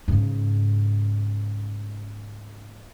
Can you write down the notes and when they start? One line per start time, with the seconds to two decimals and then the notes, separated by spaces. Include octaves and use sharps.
0.08 G#2 C#3